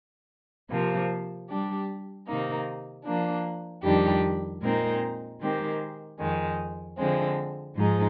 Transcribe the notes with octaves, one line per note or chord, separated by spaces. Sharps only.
C3 F3 A#3
G3 D4 G4
C3 D#3 A#3 D#4
F3 A#3 D4
F2 D#3 G3 D4 G4
A#2 G#3 C4 D#4 A#4
D#3 G#3 C4 G4 A#4
F2 D#3 G#3
D3 F3 G#3 C4
G#2 F3 G#3 D#4